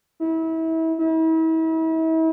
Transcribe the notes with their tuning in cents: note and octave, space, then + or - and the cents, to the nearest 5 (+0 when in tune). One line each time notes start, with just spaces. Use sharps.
E4 -30
E4 -40